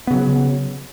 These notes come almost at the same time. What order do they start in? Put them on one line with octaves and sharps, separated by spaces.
B3 C#3 F#3